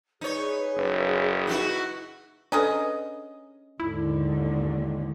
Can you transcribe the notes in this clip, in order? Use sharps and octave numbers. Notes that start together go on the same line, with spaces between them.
D#4 G#4 B4 C#5
F#1
D#4 E4 F#4
C#4 D4 G#4 A4 B4 D#5
D#2 G#2 D3 E4